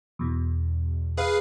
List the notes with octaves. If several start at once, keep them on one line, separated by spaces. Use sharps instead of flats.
E2 B2
G#4 B4 F5